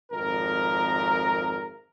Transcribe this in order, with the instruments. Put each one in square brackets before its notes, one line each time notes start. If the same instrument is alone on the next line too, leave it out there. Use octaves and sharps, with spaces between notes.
[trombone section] G#1 F2 A#4